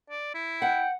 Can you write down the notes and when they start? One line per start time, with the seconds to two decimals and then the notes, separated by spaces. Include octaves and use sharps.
0.10 D5
0.34 E4
0.62 F#5 G5